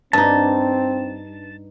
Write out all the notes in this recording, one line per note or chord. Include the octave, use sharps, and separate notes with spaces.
G2 C4 D4 D#4 A5